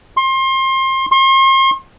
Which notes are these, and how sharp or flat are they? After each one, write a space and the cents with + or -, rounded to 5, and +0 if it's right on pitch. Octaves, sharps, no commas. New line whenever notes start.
C6 +30
C6 +40